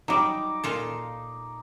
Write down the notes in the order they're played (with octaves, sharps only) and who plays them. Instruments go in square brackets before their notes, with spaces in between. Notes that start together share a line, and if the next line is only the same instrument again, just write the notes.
[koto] F#3 G3 [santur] D#4 D6
[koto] A#2 F4 A4